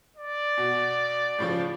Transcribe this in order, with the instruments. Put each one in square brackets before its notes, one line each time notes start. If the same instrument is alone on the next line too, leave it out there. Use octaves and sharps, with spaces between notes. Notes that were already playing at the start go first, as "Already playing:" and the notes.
[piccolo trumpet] D5
[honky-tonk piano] B2
A2 C#3 F3